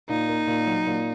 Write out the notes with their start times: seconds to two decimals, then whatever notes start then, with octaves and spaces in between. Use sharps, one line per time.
0.09 A#2 D#4
0.29 A#3
0.47 A#2
0.67 F#3
0.86 A#2